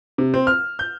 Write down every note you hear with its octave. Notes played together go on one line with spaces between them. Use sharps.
C3
C4
F6
G6